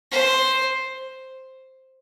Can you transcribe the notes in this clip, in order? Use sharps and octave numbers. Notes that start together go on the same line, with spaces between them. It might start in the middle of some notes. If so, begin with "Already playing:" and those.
C5